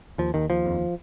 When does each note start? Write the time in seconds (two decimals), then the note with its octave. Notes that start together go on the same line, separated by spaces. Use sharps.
0.18 D#2 F3
0.34 D#2 D#3
0.50 D#2 F3
0.66 F2